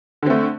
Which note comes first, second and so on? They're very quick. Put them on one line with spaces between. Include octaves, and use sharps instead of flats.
D3 C4 A3